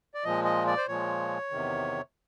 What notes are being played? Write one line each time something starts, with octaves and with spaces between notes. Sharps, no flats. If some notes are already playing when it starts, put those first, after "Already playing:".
D5
A#2 F3 G#3 D#5
D#5
D5
C5
A#2 F3 G#3 C#5
E2 C3 D#3